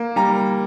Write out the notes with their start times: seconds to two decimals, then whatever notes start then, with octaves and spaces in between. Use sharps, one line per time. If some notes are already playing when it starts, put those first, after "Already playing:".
Already playing: A#3
0.16 G3 A#5